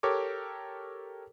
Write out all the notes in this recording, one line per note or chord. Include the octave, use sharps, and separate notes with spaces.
G4 A4 A#4 C#5 D6